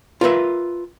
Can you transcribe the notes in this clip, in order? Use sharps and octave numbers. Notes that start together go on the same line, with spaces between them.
F4 A#4 B4 E5